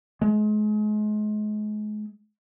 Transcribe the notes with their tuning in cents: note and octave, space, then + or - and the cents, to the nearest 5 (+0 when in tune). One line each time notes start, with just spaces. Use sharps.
G#3 +35